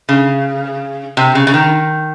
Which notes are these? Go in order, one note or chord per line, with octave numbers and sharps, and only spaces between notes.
C#3
C3
C#3
C#3
D#3